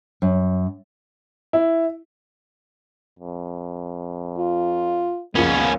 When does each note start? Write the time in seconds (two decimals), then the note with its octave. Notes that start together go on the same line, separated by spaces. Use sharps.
0.22 F#2
1.53 E4
3.19 F2
4.38 F4
5.35 C#2 F3 G#3 A#3 B3 C#4